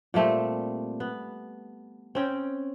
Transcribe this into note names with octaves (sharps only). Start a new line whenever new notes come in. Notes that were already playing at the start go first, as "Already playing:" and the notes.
A#2 G3 A3 C4
B3
C4 C#4 G5